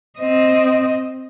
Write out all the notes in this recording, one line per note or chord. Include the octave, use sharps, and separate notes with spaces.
C4 D#5